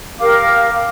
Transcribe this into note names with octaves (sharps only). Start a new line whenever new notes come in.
G4 A#4 F5 D6